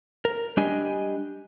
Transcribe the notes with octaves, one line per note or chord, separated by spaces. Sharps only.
A#4
G3 D4 G4 D#5 G#5